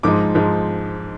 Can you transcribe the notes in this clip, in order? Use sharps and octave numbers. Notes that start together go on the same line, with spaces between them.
G#2 F3 G#3 D#4 D6
G#2 F3 G#3 D#4